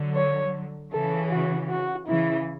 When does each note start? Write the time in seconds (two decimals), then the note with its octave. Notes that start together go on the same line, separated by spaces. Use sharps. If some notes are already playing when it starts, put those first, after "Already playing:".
Already playing: D3 F#3
0.15 C#5
0.92 C#3 E3 A4
1.31 F#4
1.69 F#4
2.07 C#3 E3 E4